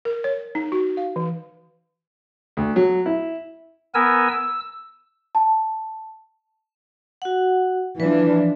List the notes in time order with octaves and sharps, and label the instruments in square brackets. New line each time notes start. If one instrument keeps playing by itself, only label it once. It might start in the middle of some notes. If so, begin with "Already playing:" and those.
[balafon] A#4
C#5
D#4
F#4
F5
E3
[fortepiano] D2
F#3
E4
[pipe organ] B3 A#4 G#5 E6
E6
[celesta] A5
[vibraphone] F#4 F#5
[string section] E3 F3 D4 [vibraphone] B4